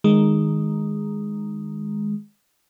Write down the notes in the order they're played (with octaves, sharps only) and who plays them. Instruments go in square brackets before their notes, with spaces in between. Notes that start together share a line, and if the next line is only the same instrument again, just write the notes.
[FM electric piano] D#3 G#3